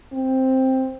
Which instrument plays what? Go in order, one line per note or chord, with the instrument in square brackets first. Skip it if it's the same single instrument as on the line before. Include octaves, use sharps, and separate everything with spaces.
[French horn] C4